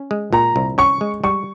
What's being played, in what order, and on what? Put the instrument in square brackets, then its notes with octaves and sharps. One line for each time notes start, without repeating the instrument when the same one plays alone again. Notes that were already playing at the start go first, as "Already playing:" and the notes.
Already playing: [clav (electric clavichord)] C#4
G#3
[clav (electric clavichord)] A#2 [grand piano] A#5
[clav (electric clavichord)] C2
[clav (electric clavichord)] C#4 [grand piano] C#6
[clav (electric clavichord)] G#3
[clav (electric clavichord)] G3 [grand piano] C#6